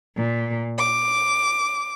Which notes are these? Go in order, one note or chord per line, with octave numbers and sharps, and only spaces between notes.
A#2
D6